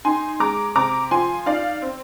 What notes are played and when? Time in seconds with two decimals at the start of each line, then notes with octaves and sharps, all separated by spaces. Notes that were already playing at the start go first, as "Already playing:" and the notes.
0.05 D#4 G#5 C6
0.40 G#3 A#5 D6
0.75 C3 A#5 D6
1.11 F3 G#5 C6
1.46 D#4 D5 F5
1.82 C4